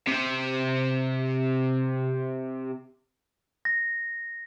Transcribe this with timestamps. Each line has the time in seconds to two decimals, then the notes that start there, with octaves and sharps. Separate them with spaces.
0.07 C3 C4
3.65 A#6